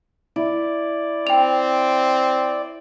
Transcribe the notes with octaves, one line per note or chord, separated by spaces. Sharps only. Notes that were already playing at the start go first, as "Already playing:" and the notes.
E4 D5
C4 G5 F7